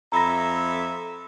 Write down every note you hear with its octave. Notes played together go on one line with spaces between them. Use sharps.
F2 A4 E5 A#5 B5 A#6